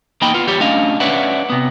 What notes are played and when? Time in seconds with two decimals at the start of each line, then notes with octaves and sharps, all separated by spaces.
0.21 E2 A#3 D#4 D#5 G5 B5
0.34 B3 F4
0.47 E2 G3 G4 C#5
0.60 A3 C#4 D4 D#5 F5
1.00 C#4 B4 C#5 D5 E5 F#5
1.50 C3 B3